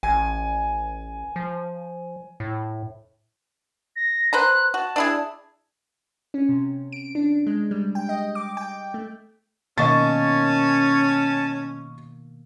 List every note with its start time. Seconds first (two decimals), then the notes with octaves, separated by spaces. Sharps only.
0.03 A1 G#5
1.36 F3
2.40 A2
3.96 A#6
4.33 B4 C5 A#5 F#6
4.74 F#4 A5
4.96 D4 E4 G#4
6.34 C#4
6.49 C3
6.92 D7
7.15 D4
7.47 G#3
7.71 G3
7.95 G5
8.09 D#5
8.35 D6
8.57 G5
8.94 A3
9.78 B2 D#3 A#3 C#4 D#5 A5 C#6 A6